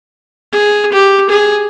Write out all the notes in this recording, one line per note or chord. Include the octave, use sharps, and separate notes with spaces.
G#4
G4
G#4